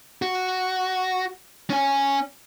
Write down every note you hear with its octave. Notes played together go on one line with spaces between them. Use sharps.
F#4
C#4 G#5